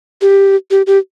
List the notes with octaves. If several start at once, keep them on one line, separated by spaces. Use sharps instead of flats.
G4
G4
G4